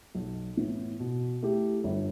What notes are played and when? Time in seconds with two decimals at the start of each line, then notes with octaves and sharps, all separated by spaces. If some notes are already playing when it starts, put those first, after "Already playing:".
0.15 B1
0.57 A2 E3 B3
1.00 B2
1.42 A3 E4 G4
1.84 G1